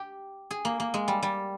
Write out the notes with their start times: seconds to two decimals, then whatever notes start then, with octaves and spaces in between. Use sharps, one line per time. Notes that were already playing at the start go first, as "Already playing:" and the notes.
Already playing: G4
0.51 G#4
0.65 A#3
0.80 A#3
0.94 G#3
1.08 G3
1.23 G3